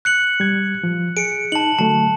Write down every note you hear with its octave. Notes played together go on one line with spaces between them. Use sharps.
F#6 C#7 F#7
G3 G#6
F3
G#4 C#7 D7
D#4 A5 F#7
D3 F#3 A3 A5